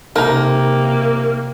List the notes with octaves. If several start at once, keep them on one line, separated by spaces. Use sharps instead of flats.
C3 A#3 D#4 A#4 A#5